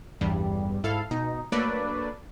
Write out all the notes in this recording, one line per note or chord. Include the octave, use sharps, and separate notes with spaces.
A1 E2 G2 G3
G#2 E4 A4 F5
B2 D#4
F#3 A3 A#3 D4 B4 D5